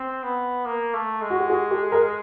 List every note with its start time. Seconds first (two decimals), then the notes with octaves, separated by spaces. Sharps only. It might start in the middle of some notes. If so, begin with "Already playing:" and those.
Already playing: C4
0.23 B3
0.65 A#3
0.94 A3
1.21 G#3
1.30 F#4
1.40 G4
1.50 F#4 G#4
1.71 G4 A4
1.92 G#4 A#4